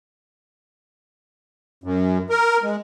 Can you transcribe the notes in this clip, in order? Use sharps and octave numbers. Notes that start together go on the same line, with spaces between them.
F#2
A#4
G#3